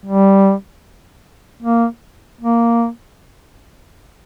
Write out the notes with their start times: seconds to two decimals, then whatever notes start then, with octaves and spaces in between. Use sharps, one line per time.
0.05 G3
1.62 A#3
2.41 A#3